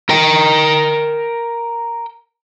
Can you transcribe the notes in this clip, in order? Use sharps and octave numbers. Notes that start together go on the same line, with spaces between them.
A#4 G5